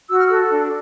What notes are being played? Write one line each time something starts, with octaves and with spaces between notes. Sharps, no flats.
F#4 E6
F6
A4 E6
D4